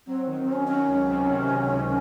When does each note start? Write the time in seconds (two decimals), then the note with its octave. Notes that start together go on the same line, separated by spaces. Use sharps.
0.07 F#3 C4
0.27 D#3
0.38 C4
0.47 D#3
0.53 C#4
0.68 F#3 C#4
0.88 C#2
1.08 C3
1.28 D#3
1.48 C#2
1.68 C3